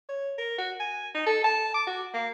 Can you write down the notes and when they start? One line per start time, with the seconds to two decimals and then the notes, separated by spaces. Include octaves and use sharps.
0.09 C#5
0.38 A#4
0.58 F#4
0.80 G#5
1.15 D#4
1.26 A4
1.44 A5
1.74 D6
1.87 F#4
2.14 A#3